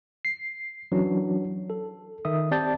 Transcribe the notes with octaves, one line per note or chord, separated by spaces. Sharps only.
C7
E3 F#3 C#4 D4
A4
D#3 E5 D#6
C4 G4 D5 A5 G6 A6